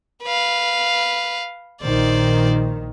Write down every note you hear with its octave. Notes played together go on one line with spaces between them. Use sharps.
B4 F5
A#1 D#3 C5 D5